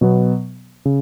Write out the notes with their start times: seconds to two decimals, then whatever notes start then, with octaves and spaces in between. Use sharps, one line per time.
0.01 B2 F#3 B3
0.85 C#3